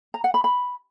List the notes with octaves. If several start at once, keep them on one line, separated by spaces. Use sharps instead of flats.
A#5
F#5
B5
B5